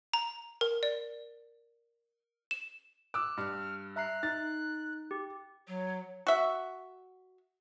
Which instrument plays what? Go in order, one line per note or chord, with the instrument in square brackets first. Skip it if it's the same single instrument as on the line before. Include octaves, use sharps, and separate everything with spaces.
[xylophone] A#5
A#4
D5
E7
[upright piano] D6 E6 [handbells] F#6
[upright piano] G2 [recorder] F6
[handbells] E5 A#5 C7 [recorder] F#6
[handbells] D#4 [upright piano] A6
[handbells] G4
[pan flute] F#3
[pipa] F#4 E5